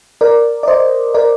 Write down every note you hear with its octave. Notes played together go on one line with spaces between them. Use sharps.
A#4 D5
D5
C5 D#5
A#4 D5